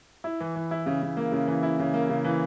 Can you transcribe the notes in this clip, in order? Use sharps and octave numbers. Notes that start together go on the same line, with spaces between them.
E4
E3
E3
E4
C#3
C#3
A#3
C#3
E3
E4
C#3
A#3
C#3
E3